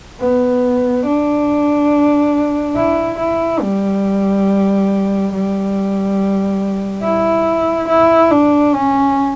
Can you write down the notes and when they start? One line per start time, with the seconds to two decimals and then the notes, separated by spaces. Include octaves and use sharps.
0.20 B3
1.06 D4
2.76 E4
3.18 E4
3.61 G3
5.33 G3
7.03 E4
7.89 E4
8.31 D4
8.73 C#4